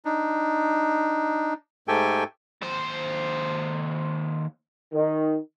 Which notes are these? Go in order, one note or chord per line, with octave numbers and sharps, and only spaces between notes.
D4 D#4
G#2 A3 G4 A4 G5 G#5
D#2 C5
D#3